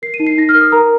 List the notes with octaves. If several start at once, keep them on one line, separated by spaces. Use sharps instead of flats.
A#4 C7
D#7
D#4
C7
D#4 A#6
F6
A#4
D#6
A#4 A#5